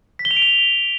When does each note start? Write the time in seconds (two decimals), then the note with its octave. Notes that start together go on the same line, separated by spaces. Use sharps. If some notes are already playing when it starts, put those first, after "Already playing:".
0.19 B6
0.25 G7
0.31 F7
0.36 D7
0.42 F7